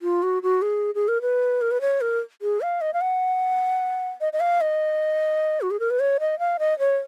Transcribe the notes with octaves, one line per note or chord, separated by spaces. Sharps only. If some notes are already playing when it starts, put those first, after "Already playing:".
F4
F#4
F#4
G#4
G#4
A#4
B4
A#4
B4
C#5
A#4
G#4
F5
D#5
F5
F#5
D#5
D#5
F5
D#5
F#4
G#4
A#4
B4
C#5
D#5
F5
D#5
C#5